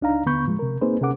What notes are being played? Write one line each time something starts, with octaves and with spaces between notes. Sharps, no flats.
C#2 D4 D#4 F5 A#5
D#2 D3 B3 B5 C#6 G6
A2 F3 G#3
C3 A#4
A#3 C4 D#4 G#4 B4 C5
C3 C#4 G#4 A#4 F#5 D6